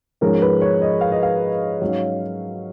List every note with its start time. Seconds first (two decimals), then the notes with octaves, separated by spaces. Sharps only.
0.21 G#2 F3 G#3 C#4 A#4
0.42 B4
0.62 C#5
0.81 D#5
1.01 F5
1.12 D#5
1.23 F5
1.81 G#2 F#3 C#4